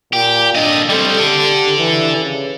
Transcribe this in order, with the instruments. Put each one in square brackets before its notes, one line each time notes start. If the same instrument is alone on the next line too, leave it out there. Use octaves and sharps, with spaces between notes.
[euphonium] A#2 [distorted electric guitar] G4
[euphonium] D4 [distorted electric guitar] A4 D#5
[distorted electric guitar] G3 C4 [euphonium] A4
[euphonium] G4 [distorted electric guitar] A4 D5
[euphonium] E3
C#3